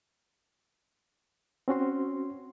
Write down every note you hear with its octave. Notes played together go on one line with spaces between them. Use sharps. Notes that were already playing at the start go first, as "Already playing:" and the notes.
C4 C#4 F#4 C6